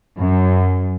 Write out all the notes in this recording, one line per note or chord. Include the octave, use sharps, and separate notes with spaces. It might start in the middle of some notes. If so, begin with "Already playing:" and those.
F#2